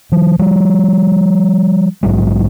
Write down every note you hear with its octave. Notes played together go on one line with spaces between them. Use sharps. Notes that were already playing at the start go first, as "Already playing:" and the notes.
E3 F#3
F3 G3
A#1 G#2 F#3 G#3